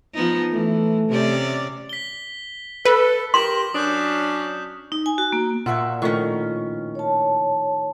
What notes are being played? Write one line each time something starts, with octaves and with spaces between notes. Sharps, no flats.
F3 B3 D#4
E3 A3
C3 C#4 D5
B6 G7
A4 B4
G4 A#4 C6 B6 E7 F#7
F#3 C#4 D4 D#6 F#6 G6
D#4
G#5
F#4
A#3
A#2 F4 F#4 E5 C#6
A2 D#3 F3 C#4 C#6
C#5 A5